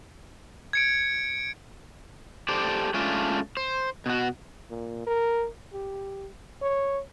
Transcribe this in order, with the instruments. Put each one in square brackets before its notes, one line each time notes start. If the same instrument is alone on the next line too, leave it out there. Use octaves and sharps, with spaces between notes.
[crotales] G#6 C#7 D7
[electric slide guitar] G4 A4 C5 D5
G#3 A3 C#4 D4 F4
C5
B2 F#4
[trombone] A#2
A#4
G4
C#5